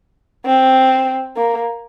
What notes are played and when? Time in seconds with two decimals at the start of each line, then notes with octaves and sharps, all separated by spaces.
0.46 C4
1.36 A#3